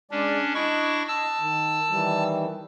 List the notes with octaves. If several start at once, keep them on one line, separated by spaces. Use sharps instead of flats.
G#3 C#4 D4 D5
D4 E4 D#5 C#6
A5 E6
D#3
D#3 E3 G3